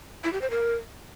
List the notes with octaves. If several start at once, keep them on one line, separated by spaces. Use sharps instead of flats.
E4
G4
C5
A#4